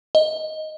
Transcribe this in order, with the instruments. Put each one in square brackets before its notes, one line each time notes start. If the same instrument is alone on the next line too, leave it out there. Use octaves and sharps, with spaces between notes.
[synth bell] D#5